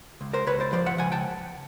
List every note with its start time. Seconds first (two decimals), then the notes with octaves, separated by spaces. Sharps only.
0.21 C#2
0.33 A#4 C5
0.47 C#2 B4 C#5
0.60 C5 D5
0.73 F3 C5 D5
0.86 E5 F#5
0.98 C#2 F#5 G#5
1.12 G5 A5